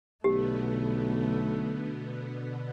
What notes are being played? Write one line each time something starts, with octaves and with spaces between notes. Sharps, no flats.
B1 B2 D3 A3 B3 G4